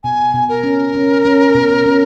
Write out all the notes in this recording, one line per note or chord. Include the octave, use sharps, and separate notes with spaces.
B2 G#5
B2
A#4
C#4
C#4
C#4
B2
C#4